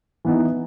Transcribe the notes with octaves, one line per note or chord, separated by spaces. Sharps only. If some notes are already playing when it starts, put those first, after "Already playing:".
E3 B3 D#4